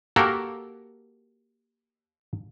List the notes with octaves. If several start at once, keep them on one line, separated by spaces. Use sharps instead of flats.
A#3 F#4 G4 A4 A#4